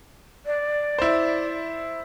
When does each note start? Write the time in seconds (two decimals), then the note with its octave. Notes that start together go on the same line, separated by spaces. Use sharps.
0.46 D5
0.99 E4 C5